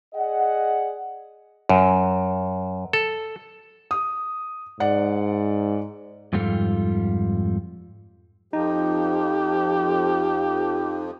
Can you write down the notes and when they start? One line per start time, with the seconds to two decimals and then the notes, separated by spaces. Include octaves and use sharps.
0.14 G#4 D5 D#5 F#5
1.69 F#2
2.93 A4
3.91 D#6
4.80 G#2 D5 F#5
6.33 F2 G#2 G3 F4 A4
8.53 F2 F3 D#4 G4